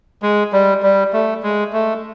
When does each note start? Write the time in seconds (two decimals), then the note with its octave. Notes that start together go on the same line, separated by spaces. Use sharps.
0.22 G#3
0.53 G3
0.83 G3
1.13 A3
1.43 G#3
1.73 A3